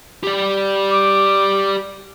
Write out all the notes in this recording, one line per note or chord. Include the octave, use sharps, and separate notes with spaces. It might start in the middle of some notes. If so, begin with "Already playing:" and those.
G4 D5
D6